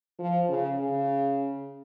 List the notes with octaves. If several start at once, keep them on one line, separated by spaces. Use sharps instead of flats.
F3
C#3
C#3